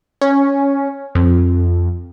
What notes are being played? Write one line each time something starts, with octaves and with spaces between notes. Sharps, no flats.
C#4
F2